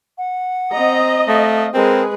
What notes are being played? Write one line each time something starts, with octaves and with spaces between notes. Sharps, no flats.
F#5
C4 D#5 A#5
A3 F5
G#3 C4 G#4 A#4 B4